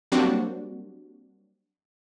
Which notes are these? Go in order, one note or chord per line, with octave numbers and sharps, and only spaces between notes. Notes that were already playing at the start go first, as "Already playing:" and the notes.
F#3 G3 A#3 C4 D4 F#4